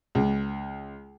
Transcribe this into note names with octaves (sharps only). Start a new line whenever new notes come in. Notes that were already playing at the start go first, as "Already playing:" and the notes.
C#2